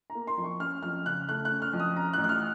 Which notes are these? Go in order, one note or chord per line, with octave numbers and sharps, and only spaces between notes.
A#5
A#3
C6
F2
C#6
C#4 F6
F2 F6
C#3 F#6
A3 F#6
F#6
C#4
F6
F2
D#6
C#4 A#5
F#6
A1
F#6
F6